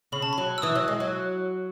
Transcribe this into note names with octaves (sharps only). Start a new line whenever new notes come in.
C#3 B5
A5
F#3 B5
E6
E3 D#6
F#3
G#3
F#3